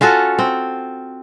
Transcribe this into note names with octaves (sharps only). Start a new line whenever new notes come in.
C#4 F4 F#4 A4
C4